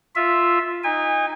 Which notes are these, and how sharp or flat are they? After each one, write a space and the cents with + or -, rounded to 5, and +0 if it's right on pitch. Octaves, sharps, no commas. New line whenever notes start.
F4 +0 E5 +0
D#4 +0 G#5 -35